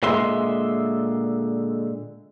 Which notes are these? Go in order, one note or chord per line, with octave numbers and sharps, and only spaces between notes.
A#2 D3 G#3 E5 C6